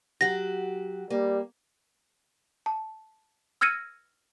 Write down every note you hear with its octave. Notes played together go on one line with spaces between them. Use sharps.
F#3 F#4 G4 A#6
G3 A#3
A5
E6 F6 G#6 A#6 C#7 D#7